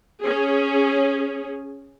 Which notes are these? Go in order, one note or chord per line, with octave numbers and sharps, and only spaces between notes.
C#4 G#4